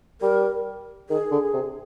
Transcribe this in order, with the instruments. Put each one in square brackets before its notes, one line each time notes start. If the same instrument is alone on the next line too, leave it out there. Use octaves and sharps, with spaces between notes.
[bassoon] G3 [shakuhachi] A#4
[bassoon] D#3 [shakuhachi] G#4
[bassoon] D3
C3